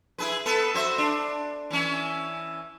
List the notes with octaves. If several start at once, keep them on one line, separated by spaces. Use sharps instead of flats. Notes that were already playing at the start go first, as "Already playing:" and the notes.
E4 G#4 B4
B3 A4 B4
F#4 C5 E5
D4
E3 C#4